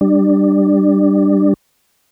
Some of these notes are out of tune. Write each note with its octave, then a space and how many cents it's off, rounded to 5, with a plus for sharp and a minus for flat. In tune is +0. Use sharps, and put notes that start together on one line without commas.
G3 +0 D4 +15